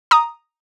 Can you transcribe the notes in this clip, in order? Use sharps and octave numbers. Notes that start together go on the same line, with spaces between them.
A#5 D#6